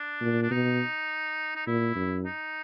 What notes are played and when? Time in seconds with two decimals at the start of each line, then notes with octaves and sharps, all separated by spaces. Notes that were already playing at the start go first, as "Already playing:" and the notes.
Already playing: D4
0.22 A#2
0.42 D4
0.51 B2 D#4
1.56 D#4
1.67 A#2 E4
1.96 F#2
2.25 D#4